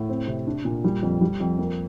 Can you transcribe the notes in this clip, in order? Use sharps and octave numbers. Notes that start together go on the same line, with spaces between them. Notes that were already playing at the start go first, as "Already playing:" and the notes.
Already playing: A2
C4
C3
D4
A#2
G3
F2
G3
F2
A#3